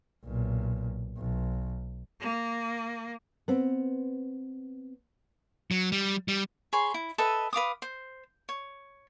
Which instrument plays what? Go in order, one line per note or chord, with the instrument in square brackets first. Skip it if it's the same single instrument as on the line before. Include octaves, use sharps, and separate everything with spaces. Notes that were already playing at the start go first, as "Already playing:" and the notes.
[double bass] B1 A#2
B1
[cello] A#3
[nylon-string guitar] B3 C4
[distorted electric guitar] F#3
G3
G3
[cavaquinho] G#4 C#5 B5 C6
E4
A4 B4 D#5 E5
B4 F5 D6 D#6
C5
C#5